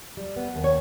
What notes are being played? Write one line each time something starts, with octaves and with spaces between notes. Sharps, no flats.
G3
B3
D#2
C#5